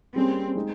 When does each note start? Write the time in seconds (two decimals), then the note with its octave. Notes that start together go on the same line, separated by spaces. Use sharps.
0.15 G3 A#3 C4 C#4 G#4
0.56 G#3 C4 D#4